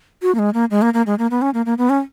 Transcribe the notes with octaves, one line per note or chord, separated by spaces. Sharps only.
F#4
A#3
G#3
A#3
G#3
A#3
A#3
G#3
A#3
B3
C#4
A#3
A#3
B3
C#4